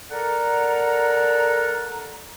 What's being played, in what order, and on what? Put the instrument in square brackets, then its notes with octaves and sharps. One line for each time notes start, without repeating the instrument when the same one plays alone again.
[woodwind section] A4 A#4 D5 F#5 A#5